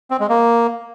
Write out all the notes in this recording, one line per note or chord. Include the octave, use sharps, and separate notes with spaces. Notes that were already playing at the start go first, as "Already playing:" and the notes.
C4
G#3
A#3